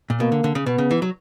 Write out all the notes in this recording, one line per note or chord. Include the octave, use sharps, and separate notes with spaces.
A#2
B2 A#3
D3
D3
C#3
B2 B3
C#3
E3
F#3